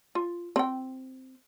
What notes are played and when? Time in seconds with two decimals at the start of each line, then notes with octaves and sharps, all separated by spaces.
0.15 F4
0.56 C4 G5